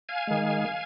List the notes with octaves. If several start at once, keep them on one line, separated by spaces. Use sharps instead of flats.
F5 G#5
D#3 G#3